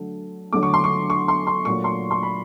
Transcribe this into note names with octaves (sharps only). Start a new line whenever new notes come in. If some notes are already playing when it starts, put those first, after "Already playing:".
Already playing: D3 F#3 A3
D3 F#3 A3 D6
C#6
C6
C#6
C#6
C6
C6
A#2 F#3 A3 C#6
C6
C6
B5